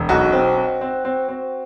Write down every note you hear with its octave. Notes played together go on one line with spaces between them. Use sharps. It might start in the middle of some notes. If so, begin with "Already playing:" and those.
Already playing: E1
B1 F#4
C4
C4
C4
C4
C4